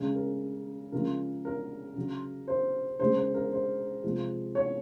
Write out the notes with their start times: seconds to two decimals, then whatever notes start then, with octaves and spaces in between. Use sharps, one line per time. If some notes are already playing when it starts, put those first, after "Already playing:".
Already playing: C#3 G#3 G#4
0.15 A#4
0.92 C#3 F3 G#3 A#4
1.45 A#4
1.96 C#3 F#3
2.48 C5
2.99 C#3 G#3 C5
3.17 C5
3.34 A#4
3.52 C5
4.04 C3 F3 G#3
4.55 C#5